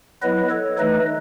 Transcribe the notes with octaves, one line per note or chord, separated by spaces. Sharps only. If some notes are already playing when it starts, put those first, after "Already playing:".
F#3 B3 E4 B4 D#5
A4 C#5
E3 A3 D#4 B4 D#5